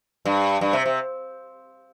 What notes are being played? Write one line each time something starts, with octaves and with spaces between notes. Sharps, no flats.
G2
G2
C3
C3